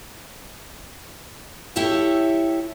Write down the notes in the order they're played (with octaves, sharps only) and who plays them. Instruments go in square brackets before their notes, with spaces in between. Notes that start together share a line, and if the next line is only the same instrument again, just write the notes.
[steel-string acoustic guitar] E4 G4 A4 C#5 E5